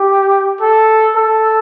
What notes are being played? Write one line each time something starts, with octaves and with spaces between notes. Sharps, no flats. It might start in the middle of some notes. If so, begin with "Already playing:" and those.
Already playing: G4
A4
A4